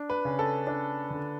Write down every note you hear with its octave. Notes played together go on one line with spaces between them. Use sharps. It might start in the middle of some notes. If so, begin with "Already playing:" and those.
Already playing: D4
B4
C#3
A4
D4
D3